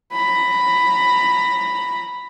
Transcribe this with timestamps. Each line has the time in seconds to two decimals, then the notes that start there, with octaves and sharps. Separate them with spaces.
0.13 A#5 B5